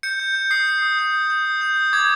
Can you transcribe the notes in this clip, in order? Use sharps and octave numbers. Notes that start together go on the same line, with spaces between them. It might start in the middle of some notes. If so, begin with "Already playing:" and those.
G6 C#7
G6
G6
D#6 C7
G6
D#6
G6
D#6
G6
D#6
G6
D#6
D6 G#6